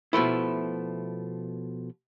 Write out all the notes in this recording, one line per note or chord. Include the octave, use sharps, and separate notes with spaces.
B2 F3 A3 E4